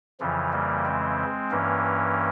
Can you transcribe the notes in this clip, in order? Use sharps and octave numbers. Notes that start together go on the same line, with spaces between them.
F2 C#3 E3 F3
G3 A#3
G#3 C4
G2 E3 A#3 C#4